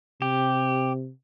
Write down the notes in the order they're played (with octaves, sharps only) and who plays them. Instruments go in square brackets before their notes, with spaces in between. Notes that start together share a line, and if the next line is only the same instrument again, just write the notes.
[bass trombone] C3 [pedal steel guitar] G4